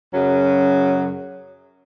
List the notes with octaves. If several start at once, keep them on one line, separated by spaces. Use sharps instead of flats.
F#2 C#3 F#3 C#4